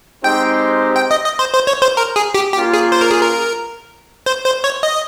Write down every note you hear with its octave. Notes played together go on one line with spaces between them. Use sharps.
G#3 C4 D#4 G4 C5 G5
G5
D#5
D#5
C5
C5
C#5
C5
A#4
G#4
G4
A#3 C#4 F4 G4
G#4
C5
A#4
G#4
A#4
C5
C5
C#5
D#5